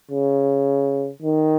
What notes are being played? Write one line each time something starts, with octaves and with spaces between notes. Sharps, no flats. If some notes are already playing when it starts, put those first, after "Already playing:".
C#3
D#3